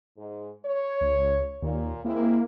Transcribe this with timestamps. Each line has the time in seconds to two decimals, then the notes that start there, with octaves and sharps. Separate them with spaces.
0.18 G#2
0.66 C#5
1.01 C#2
1.62 D#2 A#2
2.05 G#3 A#3 C4 E4